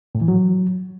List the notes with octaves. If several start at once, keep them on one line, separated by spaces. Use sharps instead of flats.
A2
E3
F#3